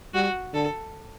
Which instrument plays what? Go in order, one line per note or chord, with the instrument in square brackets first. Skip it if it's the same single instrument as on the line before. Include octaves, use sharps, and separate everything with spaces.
[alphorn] G3 [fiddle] F#4
[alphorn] D3 [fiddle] A4